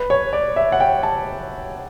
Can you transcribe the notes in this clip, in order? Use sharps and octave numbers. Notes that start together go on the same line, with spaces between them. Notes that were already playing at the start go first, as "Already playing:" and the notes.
Already playing: B4
C#5
D5
E5
F#5
G5
A5